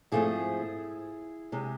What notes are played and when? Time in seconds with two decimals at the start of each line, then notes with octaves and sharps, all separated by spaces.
0.12 G#2 F3 A3 C4 E4 G#4
1.52 C3 G#3